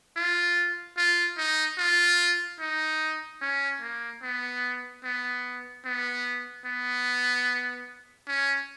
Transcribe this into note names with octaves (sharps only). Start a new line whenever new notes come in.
F4
F4
D#4
F4
D#4
C#4
A#3
B3
B3
B3
B3
C#4